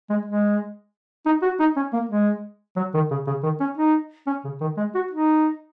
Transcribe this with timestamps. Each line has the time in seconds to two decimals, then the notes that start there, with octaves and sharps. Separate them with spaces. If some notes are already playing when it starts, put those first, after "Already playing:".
0.10 G#3
0.25 G#3
1.26 D#4
1.42 F#4
1.60 D#4
1.76 C#4
1.93 A#3
2.09 G#3
2.76 F#3
2.94 D#3
3.11 C#3
3.27 C#3
3.43 D#3
3.60 C#4
3.77 D#4
4.27 C#4
4.44 C#3
4.61 D#3
4.77 G#3
4.94 F#4
5.11 D#4